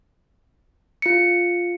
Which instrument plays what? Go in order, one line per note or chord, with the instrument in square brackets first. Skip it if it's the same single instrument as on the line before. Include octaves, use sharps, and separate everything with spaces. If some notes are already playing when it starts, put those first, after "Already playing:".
[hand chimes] F4 C#7